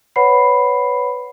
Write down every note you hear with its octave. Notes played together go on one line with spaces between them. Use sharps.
B4 C#5 F#5 B5 C7